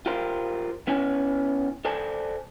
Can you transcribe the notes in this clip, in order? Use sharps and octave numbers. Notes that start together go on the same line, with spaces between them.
F4 G4 A#4 C5
B3 C#4 E4 C#5 G#5
A4 C5 D5 G#5 A5